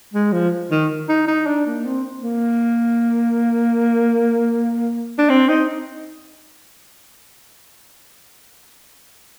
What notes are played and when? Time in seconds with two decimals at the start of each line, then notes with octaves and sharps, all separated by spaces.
0.14 G#3
0.32 F3
0.71 D#3
1.09 D#4
1.28 D#4
1.47 D4
1.67 A#3
1.85 C4
2.23 A#3
5.18 D4
5.30 C4
5.48 D#4